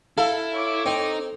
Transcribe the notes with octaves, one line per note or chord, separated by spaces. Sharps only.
E4 A4 F5
C#5 D6
C4 D#4